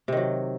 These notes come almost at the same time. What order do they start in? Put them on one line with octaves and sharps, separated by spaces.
C3 D#3 F#3